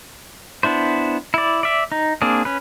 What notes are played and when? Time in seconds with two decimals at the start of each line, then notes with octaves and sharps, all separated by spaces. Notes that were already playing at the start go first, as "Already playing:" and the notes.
0.63 B3 D4 E4 C5
1.34 E4 D5
1.63 D5 E5
1.92 D#4
2.22 A#3 C4 D4 G#4
2.45 C#4 B4